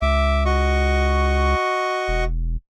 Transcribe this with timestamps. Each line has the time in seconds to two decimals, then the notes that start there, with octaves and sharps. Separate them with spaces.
0.02 C#2 E5 D6
0.45 F#4 D#5 C#6
2.08 E1